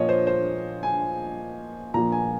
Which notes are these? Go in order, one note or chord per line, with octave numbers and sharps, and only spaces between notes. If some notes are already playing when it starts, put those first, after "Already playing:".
Already playing: A#2 F3 C#5 D#5
C5
C5
G#5
A#2 F3 A#5
G#5